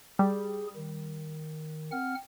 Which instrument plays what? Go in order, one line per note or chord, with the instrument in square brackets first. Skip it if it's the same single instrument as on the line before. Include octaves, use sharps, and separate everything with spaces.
[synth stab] G3 [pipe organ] G#4
[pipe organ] D#3
C4 F#5 F6